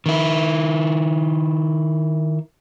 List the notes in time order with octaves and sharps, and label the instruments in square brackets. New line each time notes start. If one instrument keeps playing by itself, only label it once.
[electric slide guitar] D#3 E4